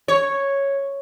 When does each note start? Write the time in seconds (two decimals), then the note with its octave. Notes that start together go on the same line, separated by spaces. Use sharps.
0.08 C#5